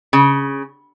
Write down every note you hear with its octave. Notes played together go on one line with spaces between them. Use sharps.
C#3